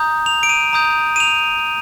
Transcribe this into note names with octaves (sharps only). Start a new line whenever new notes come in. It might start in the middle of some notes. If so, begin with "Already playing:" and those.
Already playing: A#5 D#6 G6
F7
D7
D#7
A#5 D#6 G6
D#7
F7